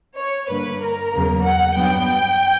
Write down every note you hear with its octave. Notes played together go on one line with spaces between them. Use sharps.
C#5
G2 D3 A#3 B4
A#4
E2 C#3 F#3 A#3
F#5
G2 F#3 B3 G5